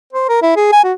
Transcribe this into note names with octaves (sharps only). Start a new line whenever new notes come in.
C5
A#4
E4
G#4
G#5
F#4